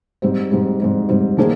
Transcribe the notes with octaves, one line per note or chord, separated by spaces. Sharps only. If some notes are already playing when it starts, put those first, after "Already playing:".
G#2 G3 C4
G#2 G3 C4
G#2 G3 C4
G#2 G3 C4
D#3 A#3 D4 G#4 C5